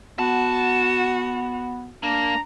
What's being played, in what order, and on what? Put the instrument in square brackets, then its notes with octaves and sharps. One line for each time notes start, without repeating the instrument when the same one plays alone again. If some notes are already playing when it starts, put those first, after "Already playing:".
[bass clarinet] B3 [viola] F#4 [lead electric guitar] A5
[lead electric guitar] A#3 [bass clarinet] D4 [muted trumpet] A#5